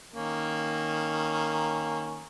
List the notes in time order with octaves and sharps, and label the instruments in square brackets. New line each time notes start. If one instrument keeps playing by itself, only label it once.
[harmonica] D#3 A#3 C#4